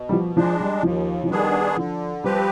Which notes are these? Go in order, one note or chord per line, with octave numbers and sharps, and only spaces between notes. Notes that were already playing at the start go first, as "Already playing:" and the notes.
Already playing: B2
G3
F3
F3 G#3 D4
G3
D#2 F3
F3
D#3 G3 B3 D4 G#4
D3 F3
F3 G3 C4 G4 B4